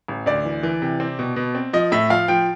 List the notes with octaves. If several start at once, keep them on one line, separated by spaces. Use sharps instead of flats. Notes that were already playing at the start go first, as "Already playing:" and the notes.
A1
D2 D5
E3
E3
C3
C4
B2
B2
C4
F3 D#5
A2 E5
F3 F5
F3 G5